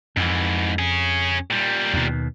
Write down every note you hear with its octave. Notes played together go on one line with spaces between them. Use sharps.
F2 G#2 E3
C#4 G#4
A#2 G3
D#2 B2